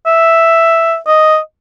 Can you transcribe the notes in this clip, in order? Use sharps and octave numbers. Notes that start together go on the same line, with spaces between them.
E5
D#5